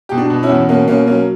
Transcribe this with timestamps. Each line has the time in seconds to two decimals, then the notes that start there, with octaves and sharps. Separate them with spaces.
0.09 B2 G4
0.18 D4 F#4
0.30 B2
0.43 C#4 E4
0.49 E2
0.69 B2 A#3 C#4
0.87 B2 A#3 C#4
1.07 F#3 A#3 C#4